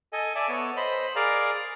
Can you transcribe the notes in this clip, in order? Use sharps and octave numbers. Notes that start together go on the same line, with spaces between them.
A4 D#5 G#5
D5 E5 G#5 A5
B3 A4 C#5
C5 D#5 B5
G#4 A#4 D5 F5 A#5